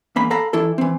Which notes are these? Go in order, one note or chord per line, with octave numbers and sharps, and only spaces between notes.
E2 A#3 B5
A4 F5 A#5 B5
E3 E4 A4
E3 C4